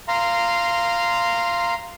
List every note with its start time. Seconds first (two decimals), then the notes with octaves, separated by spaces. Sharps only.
0.08 F5 A#5 C6